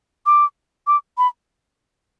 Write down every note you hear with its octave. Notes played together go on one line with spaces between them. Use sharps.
D6
D6
B5